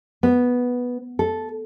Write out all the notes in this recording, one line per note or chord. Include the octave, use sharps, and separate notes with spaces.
B3
A4